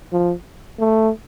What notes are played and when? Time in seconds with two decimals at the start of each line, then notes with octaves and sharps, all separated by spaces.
0.13 F3
0.79 A3